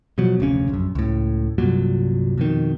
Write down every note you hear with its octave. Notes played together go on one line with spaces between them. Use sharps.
B2 F3 F#3
F1 D2 C#3 C#4
A#1 F#2
C#2 A2
C2 G2 A#2 F#3
F2 B2 D#3